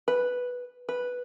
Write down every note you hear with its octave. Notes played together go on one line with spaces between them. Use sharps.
B4
B4